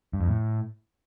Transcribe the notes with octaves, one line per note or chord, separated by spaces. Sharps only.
G2
F2
A2